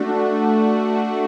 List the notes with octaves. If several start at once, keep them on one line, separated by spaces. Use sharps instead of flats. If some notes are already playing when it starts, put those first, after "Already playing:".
Already playing: A3 D4 F#4